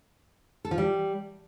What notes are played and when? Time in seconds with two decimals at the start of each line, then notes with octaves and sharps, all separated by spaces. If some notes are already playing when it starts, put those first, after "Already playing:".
0.65 A4
0.71 F3
0.78 G3